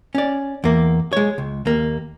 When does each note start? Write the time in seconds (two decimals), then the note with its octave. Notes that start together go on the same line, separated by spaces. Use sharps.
0.15 C#4 D5
0.64 E2 A#3
1.13 G#3 C#5
1.38 C#2
1.66 D#2 A#3